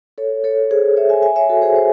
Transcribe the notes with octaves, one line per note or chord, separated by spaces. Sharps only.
A4 C#5
A4 C#5
G#4 C5
C#5 E5
E5 G#5
E5 G#5
C#5 E5
F#4 A4
G#4 C5
G#4 C5